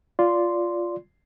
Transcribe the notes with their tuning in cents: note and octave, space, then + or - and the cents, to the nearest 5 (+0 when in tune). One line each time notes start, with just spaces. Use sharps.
F4 +0 D5 -10 C6 -5